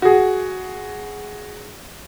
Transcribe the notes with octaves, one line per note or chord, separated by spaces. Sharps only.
F#4 G#4